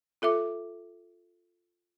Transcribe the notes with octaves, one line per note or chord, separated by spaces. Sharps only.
F4 A4 E5 D6